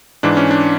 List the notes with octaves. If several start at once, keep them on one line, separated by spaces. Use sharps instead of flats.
G#2 E3 D4
C#4
D4